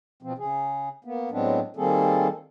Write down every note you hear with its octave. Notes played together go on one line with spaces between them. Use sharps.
B2 F3 C4
C#3 G#4
A#3 B3
A2 F#3 G#3 B3 C4 D4
D#3 G3 A#3 C4 G#4 A4